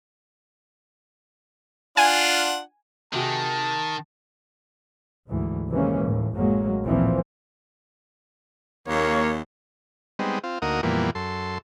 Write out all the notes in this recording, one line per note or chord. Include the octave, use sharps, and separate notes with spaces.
D4 F4 F#5 G#5
C3 D#3 F#4 G#4 A5
D2 G#2 E3
C3 D#3 E3 G#3 A#3 C#4
D#2 A2
A1 F#2 F#3 G#3 A#3
A1 D2 A#2 E3 F3 C4
D#2 A#3 C#5
G3 G#3 B3 C4 D#4
C4 F4
D2 A#3 D#4 F#4 A#4 D#6
F2 A#2 E3 G3 A#3 B3
F#2 A4 C6